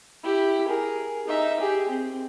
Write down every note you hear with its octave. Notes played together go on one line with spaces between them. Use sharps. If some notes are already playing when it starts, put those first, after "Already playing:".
E4 G4
G#4 A#4
D#4 E5
G4 G#4
C4